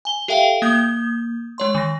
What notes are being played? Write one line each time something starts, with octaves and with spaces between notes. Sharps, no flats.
G#5 G7
G4 A4 E5 F5 G5
A#3 D#6 G6
G#3 C#5 C6
D#3 A#6